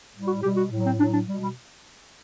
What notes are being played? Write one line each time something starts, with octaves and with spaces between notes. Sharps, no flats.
A2 G3
F#4
B2 G3 G4
F#4
A2 F#3
C4
A2 F#3 D4
D4
B2 G3
G3